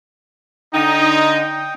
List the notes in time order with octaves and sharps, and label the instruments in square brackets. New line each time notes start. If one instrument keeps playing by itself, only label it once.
[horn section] D3 D#4 [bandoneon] G5 D#6